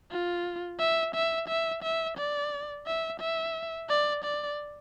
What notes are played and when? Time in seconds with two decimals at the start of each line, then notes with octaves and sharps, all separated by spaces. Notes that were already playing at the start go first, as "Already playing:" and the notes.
0.11 F4
0.79 E5
1.14 E5
1.48 E5
1.83 E5
2.17 D5
2.86 E5
3.20 E5
3.89 D5
4.24 D5